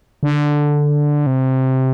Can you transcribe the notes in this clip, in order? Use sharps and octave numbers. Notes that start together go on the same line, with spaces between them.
D3
C3